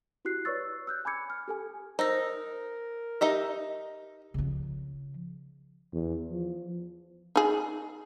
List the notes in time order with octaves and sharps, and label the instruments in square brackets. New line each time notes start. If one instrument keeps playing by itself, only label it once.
[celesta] E4 F#4 G4 F#6 C7
B4 C#5 D5 C#6 E6 A6
E6 F#6 G6
G#5 B5 D6 G#6 C#7
F6
G4 A4 G#5
[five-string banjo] D#4 [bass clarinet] A#4 [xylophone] C5 E6 A#6
[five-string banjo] D#4 D#5 E5 [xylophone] G4
[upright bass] C#3 F3
[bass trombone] E2
F3
[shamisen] D#4 G#4